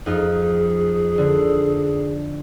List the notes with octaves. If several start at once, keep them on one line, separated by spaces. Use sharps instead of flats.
F2 D#4 F4 G#4
D3